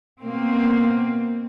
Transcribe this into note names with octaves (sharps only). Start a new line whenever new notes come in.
B2 A#3 C4